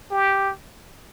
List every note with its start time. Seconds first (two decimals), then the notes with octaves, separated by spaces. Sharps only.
0.11 G4